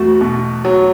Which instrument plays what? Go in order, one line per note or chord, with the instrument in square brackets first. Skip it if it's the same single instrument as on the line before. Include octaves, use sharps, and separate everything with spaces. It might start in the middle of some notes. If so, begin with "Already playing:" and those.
Already playing: [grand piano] E2 A3 [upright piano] F#4
[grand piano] B2
F#3